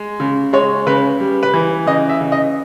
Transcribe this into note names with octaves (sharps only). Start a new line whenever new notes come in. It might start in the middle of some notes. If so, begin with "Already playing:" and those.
Already playing: G#3
C#3
G#3 C#5
C#3 B4
G3
B4
E3
C#3 D#5
E5
C#3
D#5